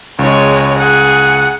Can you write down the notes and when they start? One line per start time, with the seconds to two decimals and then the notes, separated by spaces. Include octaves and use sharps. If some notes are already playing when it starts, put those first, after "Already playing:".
0.19 C#2 G#3 C#5
0.79 G#4 F#5